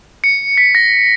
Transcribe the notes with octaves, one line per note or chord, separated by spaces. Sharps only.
C#7
B6
A#6